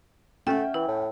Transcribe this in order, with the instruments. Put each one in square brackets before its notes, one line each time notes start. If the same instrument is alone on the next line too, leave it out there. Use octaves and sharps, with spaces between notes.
[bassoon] A3 [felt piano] C#4 G5 [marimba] E5 F#5
[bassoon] E3 [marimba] E4
[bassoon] A2